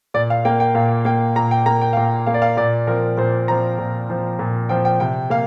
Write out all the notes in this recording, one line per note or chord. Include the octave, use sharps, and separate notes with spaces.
A#2 D5
F5
A#3 G5
G5
A#2 F5
A#3 G5
A#2 A#5
G5
A#3 A#5
G5
F5
A#2 G5
A#3 F5
D5
F5
A#2 D5
F3 C4 A#4
A#2 C5
F3 C4 A#5
A#2
F3 C4
A#2
F3 C4 G5
G5
C3 G5
A#3 F5